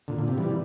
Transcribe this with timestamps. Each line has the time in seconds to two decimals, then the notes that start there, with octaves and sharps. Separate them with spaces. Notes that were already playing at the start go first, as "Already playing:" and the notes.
0.08 A#2 D3
0.19 A#2
0.28 C3
0.38 E3 G3